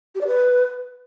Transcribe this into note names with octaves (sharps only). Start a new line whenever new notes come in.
G4
D5
B4